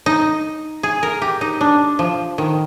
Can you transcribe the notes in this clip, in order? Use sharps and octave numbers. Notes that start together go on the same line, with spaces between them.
D#4
G#4
A#4
G4
D#4
D4
F3
D#3